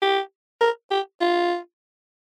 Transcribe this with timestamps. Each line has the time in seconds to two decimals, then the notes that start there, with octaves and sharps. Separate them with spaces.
0.02 G4
0.61 A#4
0.91 G4
1.21 F4